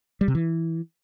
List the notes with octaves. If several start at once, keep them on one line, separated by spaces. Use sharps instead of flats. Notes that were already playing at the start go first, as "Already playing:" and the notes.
G3
C3
E3